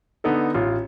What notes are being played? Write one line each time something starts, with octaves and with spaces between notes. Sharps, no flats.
D3 B3 D#4 A4
A1 F4